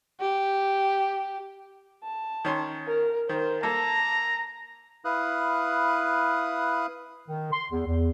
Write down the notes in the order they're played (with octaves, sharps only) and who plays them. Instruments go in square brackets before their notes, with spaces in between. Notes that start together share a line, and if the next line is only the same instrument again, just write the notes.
[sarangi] G4
[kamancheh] A5
[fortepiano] D#3 C#4 C6
[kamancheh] A#4
[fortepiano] D#3 [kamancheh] A#4 C5
[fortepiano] A#3 A4 [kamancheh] A5 [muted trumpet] A#5
[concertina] E4 B4 F5 D#6 F#6
[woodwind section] D#3
C6
E2
E2